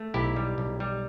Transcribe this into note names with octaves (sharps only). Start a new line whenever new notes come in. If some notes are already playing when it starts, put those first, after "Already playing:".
Already playing: A3
B1 E4 G4
G3
B1
G3